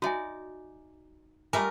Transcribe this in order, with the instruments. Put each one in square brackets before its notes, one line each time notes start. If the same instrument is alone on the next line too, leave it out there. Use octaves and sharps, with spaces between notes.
[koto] D#4 D5 [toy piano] F#4 E5 G#5
[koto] G3 A3 F4 [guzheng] A#4 [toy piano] G#5